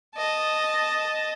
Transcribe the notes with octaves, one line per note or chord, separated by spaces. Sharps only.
D#5 A5